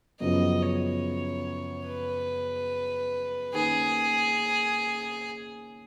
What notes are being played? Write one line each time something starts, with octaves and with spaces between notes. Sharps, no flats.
F#2 C#3 F3 B3 D#5
C#5
B4
D#3 A#3 C#4 G#4